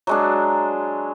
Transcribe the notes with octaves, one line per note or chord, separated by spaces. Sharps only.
F#3 G#3 D4